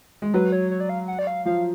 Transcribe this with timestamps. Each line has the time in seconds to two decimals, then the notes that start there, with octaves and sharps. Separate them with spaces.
0.22 G#3
0.34 F#3 B4
0.52 C#5
0.71 C#5
0.80 D5
0.89 F5
1.08 F#5
1.19 D5
1.27 F5
1.45 F3 F5